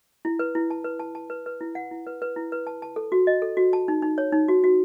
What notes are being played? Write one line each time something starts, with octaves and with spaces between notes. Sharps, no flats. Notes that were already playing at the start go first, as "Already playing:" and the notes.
E4
B4
E4
A5
B4
A5
A5
B4
B4
E4
F#5
E4
B4
B4
E4
B4
A5
A5
A4
F#4
D#5
A4
F#4
A5
D#4
D#4
C#5
D#4
F#4
F#4